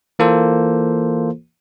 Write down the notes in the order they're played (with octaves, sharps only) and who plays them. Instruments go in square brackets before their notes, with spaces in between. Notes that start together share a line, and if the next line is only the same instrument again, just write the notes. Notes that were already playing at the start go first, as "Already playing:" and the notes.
[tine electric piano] E3 A#3 F4 A4 C5